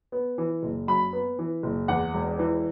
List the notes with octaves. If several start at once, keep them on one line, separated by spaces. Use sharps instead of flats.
B3
E3
F#1
F#2 B5
B3
E3
F#1
E2 F#5
E1
E3